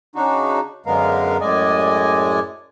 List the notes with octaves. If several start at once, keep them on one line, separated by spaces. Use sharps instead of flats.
C#3 D4 D#4 F#4
F#2 D3 G#3 B3 A#4 F5
F#2 A2 G#3 D5 D#5 G#5